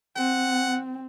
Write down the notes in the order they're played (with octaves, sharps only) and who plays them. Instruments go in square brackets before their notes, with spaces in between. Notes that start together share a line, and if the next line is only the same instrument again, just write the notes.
[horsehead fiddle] C4 [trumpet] F#5